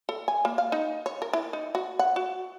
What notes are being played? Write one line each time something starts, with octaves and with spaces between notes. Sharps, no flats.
A4
G#5
A#3
F5
D#4
C#5
A#4
E4
D#4
F#4
F#5
F#4